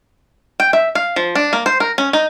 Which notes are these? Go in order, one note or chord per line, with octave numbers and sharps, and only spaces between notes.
G5
E5
F5
F3
D4
A#3
C5
A#4
C#4
D#4